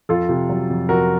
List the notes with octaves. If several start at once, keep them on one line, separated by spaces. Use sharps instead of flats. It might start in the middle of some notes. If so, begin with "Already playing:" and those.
F2 F4 A4
C3
F#3
F2
F2 F#4 A#4